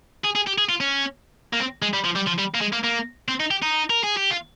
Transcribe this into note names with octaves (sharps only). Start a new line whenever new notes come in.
G#4
G#4
G4
G#4
F4
C#4
A#3
C4
G#3
G3
F3
G3
F3
G3
A#3
G#3
A#3
A#3
C4
D#4
G4
D#4
A#4
G#4
G4
F4